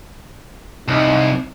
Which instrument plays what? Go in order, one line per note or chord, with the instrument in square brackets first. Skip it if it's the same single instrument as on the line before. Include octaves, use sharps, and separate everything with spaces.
[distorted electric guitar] C2 [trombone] D#4